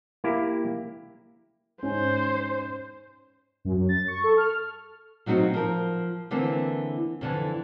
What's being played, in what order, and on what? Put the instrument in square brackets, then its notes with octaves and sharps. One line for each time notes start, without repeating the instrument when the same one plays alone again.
[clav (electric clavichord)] A#3 E4 G4
[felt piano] G#2 C#4 [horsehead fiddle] C5
[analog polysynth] F#2
F#2
A6
C#6
A4
F6
[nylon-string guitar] A#2 F#3 C4 D#4 F#4
F3 A#4
D3 E3 A#3 C4
F2 D3 E3